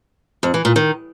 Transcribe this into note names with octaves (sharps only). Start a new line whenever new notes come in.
F2
E3
A#2
D#3